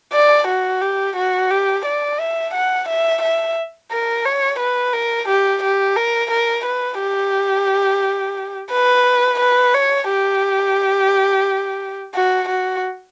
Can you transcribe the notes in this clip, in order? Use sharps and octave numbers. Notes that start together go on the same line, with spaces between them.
D5
F#4
G4
F#4
G4
D5
E5
F#5
E5
E5
A#4
C#5
B4
A#4
G4
G4
A#4
A#4
B4
G4
B4
B4
C#5
G4
F#4
F#4